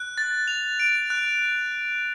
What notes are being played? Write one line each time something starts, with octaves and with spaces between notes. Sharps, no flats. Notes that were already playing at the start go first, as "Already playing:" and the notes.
Already playing: F#6
A6
F7
D7
F#6